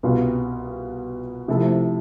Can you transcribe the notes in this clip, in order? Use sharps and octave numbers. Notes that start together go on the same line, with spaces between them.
C2 B2 B3 F4
C3 F3 A3 E4 A4